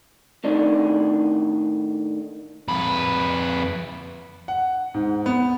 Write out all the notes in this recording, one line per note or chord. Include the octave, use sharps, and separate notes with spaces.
A2 D#3 D4
F2 B4
F#5
G#2
B3